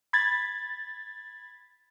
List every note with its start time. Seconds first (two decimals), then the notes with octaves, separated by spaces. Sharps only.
0.13 B5 G#6 A6